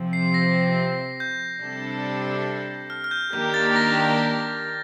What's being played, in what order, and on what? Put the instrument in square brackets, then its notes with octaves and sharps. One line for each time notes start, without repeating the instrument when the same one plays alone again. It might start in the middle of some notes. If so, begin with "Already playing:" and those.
Already playing: [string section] C3 F3 C4
[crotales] C7
A#6
G6
[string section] C3 G3 D4 A4
[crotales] F6
F6
G6
[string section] D#3 A#3 D4 G4 A#4 [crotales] G6
[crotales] A6
A#6